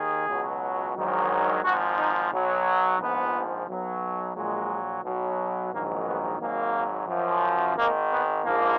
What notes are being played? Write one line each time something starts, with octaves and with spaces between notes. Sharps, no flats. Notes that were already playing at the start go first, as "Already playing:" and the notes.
Already playing: D#2 D#3 G#4
C#2 B2 F#3
A#1 G#2 D#3 F#3
G#1 G#2 F3 F#4
D#4
B1 B2 F#3
A#1 G#2 F3 B3
B1 B2 F#3
A#1 A#2 F#3 G#3
B1 B2 F#3
A#1 G#2 D#3 F#3 A#3
B3
G#1 G#2 F#3 A#3
F#2 F3
G#1 G#2 D#3 A#3
B3
A#1 G#2 F3 A#3